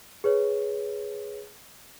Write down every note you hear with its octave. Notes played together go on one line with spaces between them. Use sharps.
G#4 B4 C#5